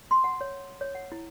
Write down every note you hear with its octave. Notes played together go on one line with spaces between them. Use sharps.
C6
F#5
C#5
C#5
F#5
E4